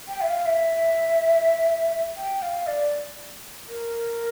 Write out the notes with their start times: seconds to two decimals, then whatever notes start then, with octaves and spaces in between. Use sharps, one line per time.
0.08 G5
0.21 E5
0.27 F5
0.46 E5
2.17 G5
2.42 F5
2.67 D5
3.68 A#4